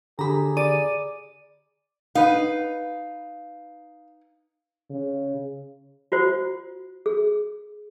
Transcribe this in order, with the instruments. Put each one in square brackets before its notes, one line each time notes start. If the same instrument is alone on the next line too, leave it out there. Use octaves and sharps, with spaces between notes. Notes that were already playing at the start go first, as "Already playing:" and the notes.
[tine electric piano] D3 G4 [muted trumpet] G#4 [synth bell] A#5 B5
[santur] D5 [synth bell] D#7
[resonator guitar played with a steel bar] D#4 B4 [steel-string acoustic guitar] F5
[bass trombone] C#3
[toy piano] F4 F#4 C5
G#4